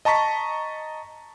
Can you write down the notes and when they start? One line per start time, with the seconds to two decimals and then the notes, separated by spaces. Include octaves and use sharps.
0.05 D#5 A5 A#5 C#6 B6